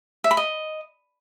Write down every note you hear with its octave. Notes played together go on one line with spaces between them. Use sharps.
E5
B5
D#5